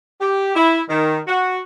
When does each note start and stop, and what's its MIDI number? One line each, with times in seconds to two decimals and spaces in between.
0.21 0.52 67
0.55 0.81 64
0.89 1.18 51
1.27 1.58 66